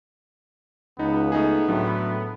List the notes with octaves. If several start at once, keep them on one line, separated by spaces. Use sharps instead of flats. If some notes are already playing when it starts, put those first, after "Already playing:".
C#2 B3 D#4
A3 D#4 G#4
A2 D3 F#3